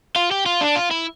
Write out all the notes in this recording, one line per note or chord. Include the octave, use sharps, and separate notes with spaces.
F4
G4
F4
D4
F4
E4